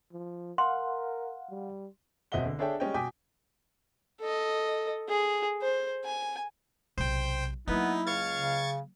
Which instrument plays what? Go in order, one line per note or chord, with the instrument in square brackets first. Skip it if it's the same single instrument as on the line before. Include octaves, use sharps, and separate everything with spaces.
[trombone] F3
[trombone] A#4 [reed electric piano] F5 F#5 [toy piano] C6
[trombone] G3
[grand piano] E1 C4 D#5 E5 F#5 G7
D3
D4 G#4 A4 C#5 E5 G5
G3 G#3 C#4 D#5 G5
B2 G5 G#5 D6 D#6 B6
[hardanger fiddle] A4 D#5
G#4
C5
G#5
[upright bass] B1 C3 [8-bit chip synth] C5 G5
[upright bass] F#3 A#3 [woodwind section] B3 [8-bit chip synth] D#4 [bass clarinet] E4
[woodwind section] C#2 F5 F6 [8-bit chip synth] C#6 G#6 A6
[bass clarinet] C#3